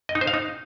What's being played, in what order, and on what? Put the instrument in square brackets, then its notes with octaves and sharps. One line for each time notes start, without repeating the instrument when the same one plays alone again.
[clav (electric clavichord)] D#5
D#4
C5
F5
D#4